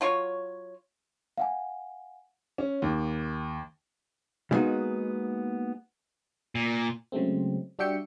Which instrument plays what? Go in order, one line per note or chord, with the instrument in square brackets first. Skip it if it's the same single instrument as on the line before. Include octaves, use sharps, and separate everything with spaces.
[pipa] F#3 F4 C#5
[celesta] F5 F#5 G#5
[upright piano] C#4
D#2
[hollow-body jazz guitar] G3 G#3 A#3 B3 D#4 F#4
[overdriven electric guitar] A#2
[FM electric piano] C#3 F#3 G#3 A3 C4
G3 D4 F#4 E5 G5 C#7